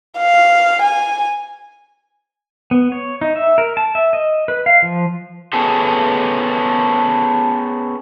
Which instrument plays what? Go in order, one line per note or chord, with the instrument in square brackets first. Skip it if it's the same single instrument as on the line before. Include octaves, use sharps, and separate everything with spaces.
[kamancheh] F5
G#5
[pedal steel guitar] B3
C#5
D#4
E5
A#4
A5
E5
D#5
B4
F5
F3
[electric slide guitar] B3 C#4 G#4 A4